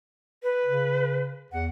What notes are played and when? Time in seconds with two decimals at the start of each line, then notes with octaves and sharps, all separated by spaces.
0.43 B4
0.65 C#3
1.52 E2 F#5